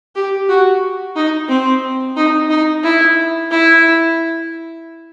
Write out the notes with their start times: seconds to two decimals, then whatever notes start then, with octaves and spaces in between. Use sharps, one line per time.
0.15 G4
0.49 F#4
1.16 D#4
1.49 C4
2.16 D#4
2.50 D#4
2.83 E4
3.50 E4